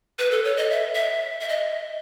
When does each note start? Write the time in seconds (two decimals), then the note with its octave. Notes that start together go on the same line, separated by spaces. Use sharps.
0.19 B4
0.31 A4
0.44 C#5
0.57 D#5
0.71 E5
0.95 E5
1.40 E5
1.49 D#5